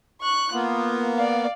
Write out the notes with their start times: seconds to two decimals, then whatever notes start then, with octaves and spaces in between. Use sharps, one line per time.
0.21 C#6 F#6
0.52 A#3 B3 F4
1.16 D5 F5